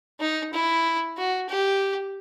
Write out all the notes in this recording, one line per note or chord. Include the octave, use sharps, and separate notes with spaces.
D#4
E4
F#4
G4